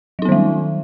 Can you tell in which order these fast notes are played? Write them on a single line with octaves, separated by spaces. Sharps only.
F#3 D#4 B3 D#3 G3